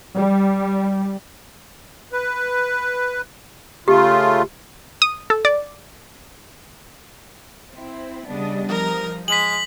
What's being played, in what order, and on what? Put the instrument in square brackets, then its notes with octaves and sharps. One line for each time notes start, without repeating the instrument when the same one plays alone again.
[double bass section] G3
[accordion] B4
[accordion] C#3 A3 F4 [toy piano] G4
[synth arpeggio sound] D#6
A4
D5
[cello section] C4 E4
[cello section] C#3 B3 D4 [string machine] G3 D#5 D#6
[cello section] F3 [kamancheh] A#4 A#5
[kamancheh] G#3 [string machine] A#6 [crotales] B6 F#7